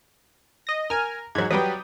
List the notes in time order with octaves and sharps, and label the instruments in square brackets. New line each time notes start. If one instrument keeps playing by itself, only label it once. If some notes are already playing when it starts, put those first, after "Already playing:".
[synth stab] D#5 A#6
[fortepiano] A#4 [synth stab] G#5 F6
[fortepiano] G#2 F#3 [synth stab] G#6
[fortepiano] F#3 G3 B4 [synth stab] G5 D#6